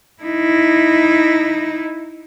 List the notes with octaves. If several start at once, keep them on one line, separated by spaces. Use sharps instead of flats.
D#4 E4